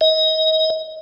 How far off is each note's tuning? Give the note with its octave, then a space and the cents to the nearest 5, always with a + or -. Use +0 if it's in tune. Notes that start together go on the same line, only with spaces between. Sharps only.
D#5 +30